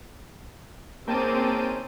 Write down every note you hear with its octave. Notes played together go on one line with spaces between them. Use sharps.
G#3 A#3 C4 C#4 D#4 G5 A5 D#7